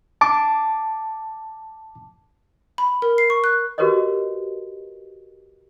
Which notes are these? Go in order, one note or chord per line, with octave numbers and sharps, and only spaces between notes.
A5 D6
B5
A#4
C7
C#6
F#6
F#4 G4 A#4 B4 C#5 D#5